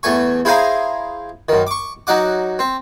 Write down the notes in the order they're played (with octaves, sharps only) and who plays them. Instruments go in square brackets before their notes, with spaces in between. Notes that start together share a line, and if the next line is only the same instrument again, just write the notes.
[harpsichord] E2 A3 G#5 C#6
E4 G#4 C5 F5 G#5 A#5
F#2 D#3
C#6 D6
F#3 D#4 F#5 D6
C4